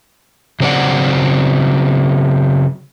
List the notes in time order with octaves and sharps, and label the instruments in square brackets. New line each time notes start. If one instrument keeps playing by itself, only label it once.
[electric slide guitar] C#3 F#3 C4 A#4 D5 F#5